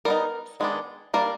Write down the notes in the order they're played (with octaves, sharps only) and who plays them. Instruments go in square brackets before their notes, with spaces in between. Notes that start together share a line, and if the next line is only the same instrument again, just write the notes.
[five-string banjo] G3 B3 D#4 A#4
D#3 G#3 B3 D4
G3 A#3 D4 A#4